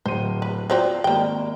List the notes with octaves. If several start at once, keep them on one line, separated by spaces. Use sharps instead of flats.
D1 C5 D#7
B4
F3 C4 F#4 C5 D5
G#1 G3 A#3 G5